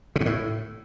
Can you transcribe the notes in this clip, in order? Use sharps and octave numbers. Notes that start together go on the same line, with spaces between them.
C#3
G#2
A2